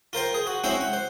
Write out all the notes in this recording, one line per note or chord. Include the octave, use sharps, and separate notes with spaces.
F4 A#4 C5 G5
G#4
F#4
G#3 C4 C#4 E4 F#4 C5
F#5
C5